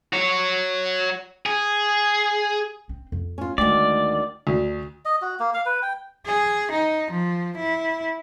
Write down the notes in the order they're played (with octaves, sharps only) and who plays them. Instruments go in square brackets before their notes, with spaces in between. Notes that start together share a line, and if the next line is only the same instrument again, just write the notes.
[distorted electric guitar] F#4 C#5
G#4
[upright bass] C4
F2
[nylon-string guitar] C#4 F4
[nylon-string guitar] D2 D#3 [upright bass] G#3 [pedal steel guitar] D5
[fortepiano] D2
[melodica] D#5
F#4
A#3
F5
B4
G5
[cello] G#4
D#4
F3
E4